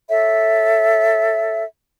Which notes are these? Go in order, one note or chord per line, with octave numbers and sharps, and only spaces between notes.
A4 C#5 E5